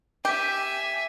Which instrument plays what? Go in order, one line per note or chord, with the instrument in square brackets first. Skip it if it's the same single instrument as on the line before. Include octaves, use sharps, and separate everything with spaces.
[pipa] G4 [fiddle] E5 G#5